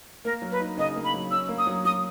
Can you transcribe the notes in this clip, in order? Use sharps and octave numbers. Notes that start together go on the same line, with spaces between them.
A#3 A#4
F#3
B4
D#4
C#3 D#5
A#3
B5
F#3
C#4 E6
A#3
D#6
F#3
F#3 D#6